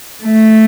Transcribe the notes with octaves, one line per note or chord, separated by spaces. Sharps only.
A3